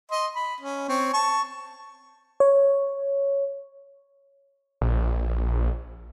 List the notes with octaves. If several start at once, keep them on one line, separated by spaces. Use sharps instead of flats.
D#5 C6
B5
C#4
C4 C#5
A5 C#6
C#5
A#1